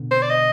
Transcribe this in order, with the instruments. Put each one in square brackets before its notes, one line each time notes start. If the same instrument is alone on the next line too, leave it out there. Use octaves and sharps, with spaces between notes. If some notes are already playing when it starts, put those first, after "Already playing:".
Already playing: [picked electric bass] B2 D3
[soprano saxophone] C5
D5
D#5